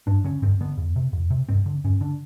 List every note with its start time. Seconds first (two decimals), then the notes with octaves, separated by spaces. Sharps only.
0.07 G2 D4
0.24 D3 C#4
0.42 G2 C4
0.61 D3 B3
0.77 F2
0.96 C3
1.13 F2
1.30 C3
1.49 G2 C4
1.66 D3
1.84 G2 C#4
2.01 D3 D4